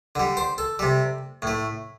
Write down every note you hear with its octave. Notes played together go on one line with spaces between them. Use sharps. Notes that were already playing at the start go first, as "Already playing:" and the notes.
D3 G3
C5
A4
C3 G3
A2 A3